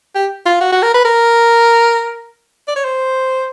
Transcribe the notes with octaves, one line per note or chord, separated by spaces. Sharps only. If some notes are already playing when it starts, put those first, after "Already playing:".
G4
F4
F#4
F#4
A#4
B4
A#4
D5
C#5
C5